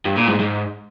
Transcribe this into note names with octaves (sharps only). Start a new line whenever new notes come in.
G2
A#2
G#2
G#2